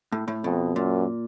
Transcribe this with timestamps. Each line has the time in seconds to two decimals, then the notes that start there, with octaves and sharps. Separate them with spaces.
0.12 A2
0.28 A2
0.44 F2 B2
0.76 F#2 A#2